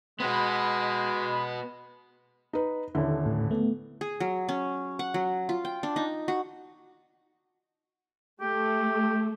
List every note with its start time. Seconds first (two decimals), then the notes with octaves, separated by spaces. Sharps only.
0.20 G#3 B3 F#4 B5
2.53 D#4 B4
2.95 D#1 D3 E4
3.26 A2
3.51 A3 B3
4.01 G#4
4.20 F#3
4.49 C#4
4.99 F#5
5.14 F#3
5.49 F4
5.65 G5
5.83 D4
5.96 D#4
6.28 F#4
8.41 A3 G4